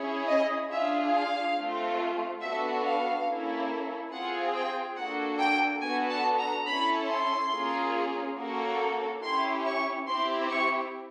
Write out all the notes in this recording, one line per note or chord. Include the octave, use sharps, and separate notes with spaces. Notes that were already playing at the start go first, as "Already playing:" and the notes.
Already playing: C#4 E4 G#4
D#5
D4 F4 G#4 E5
F5
A3 C4 F4
B3 D4 F#4 A4 E5
F5
A#3 C#4 E4 A4
C4 F4 G#4 F#5
G5
A#3 D4 F#4 A4 F#5
G5
B3 D4 F#4 A4 G#5
A5
A#5
C#4 E4 A4 B5
C6
A#3 C#4 F4 G#4
A#3 C#4 F#4 A4
C#4 E4 G4 C6
C#6
C4 E4 G4 C6
C#6